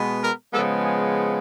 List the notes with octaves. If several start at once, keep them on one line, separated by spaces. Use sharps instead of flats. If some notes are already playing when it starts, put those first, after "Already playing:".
Already playing: B2 G#3 B3
A#4
C#3 F3 G#3 B3 A4
G#4